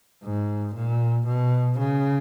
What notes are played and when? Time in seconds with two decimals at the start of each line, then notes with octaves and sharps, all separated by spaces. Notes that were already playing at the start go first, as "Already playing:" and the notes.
0.24 G#2
0.75 A#2
1.26 B2
1.79 C#3